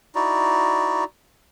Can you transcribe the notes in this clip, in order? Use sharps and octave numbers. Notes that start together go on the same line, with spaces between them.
D#4 E4 F#4 D5